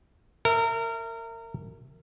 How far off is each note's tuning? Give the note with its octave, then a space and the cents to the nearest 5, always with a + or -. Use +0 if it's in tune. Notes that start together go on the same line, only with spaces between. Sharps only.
A#4 -30 E5 +0